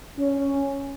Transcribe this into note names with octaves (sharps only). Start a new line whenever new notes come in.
C#4